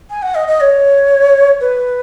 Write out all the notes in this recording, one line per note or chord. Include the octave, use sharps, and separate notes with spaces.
G#5
F#5
D#5
D#5
C#5
B4